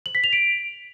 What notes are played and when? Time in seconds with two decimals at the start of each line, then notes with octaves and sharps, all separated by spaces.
0.06 F#7
0.15 B6
0.24 F7
0.33 D7